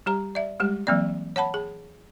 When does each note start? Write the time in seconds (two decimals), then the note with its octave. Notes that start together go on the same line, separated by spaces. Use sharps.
0.06 G3 G4 A#5
0.35 D5 E5
0.60 G3 G#3 G4
0.87 E3 F#3 A#3 C4 D5
1.36 C#5 F#5 A5 B5
1.54 G#4